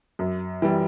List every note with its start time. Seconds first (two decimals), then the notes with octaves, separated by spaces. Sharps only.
0.19 F#2
0.62 E3 G3